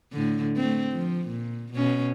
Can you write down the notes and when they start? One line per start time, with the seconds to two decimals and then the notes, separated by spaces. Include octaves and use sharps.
0.13 A2 D3
0.56 A3 C4
0.93 F3
1.29 A#2
1.73 B2 C#4